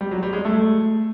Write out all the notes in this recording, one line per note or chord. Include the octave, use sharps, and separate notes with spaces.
G3
F#3
G3
G#3
A3